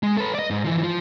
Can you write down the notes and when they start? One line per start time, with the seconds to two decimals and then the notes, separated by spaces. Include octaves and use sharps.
0.03 G#3
0.17 A4 B4
0.35 D5 D#5
0.50 G#2
0.65 E3 F3
0.83 F3